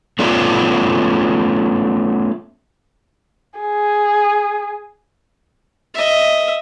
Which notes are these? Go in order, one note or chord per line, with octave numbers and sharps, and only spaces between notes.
A3 B3 C#4 F4 D5
G#4
D#5 E5